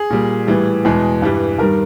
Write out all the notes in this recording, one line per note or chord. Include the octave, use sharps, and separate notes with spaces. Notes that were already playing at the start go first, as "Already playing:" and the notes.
Already playing: G#4
A#2 G3
A2 E3 G3
E2 B2 G#3
G2 E3 G3
G2 D#3 G3 A#4